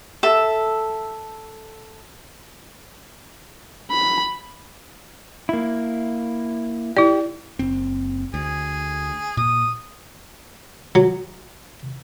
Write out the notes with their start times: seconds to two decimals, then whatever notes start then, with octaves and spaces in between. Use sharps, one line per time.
0.23 A4 E5
3.91 B5
5.49 A#3 E4
6.97 E4 G4 D5
7.59 F#1 C4
8.34 D2 G#4
9.37 A#2 D#6
10.95 F#3